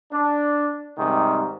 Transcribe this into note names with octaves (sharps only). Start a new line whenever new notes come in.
D4
G#2 C3 D#3 G3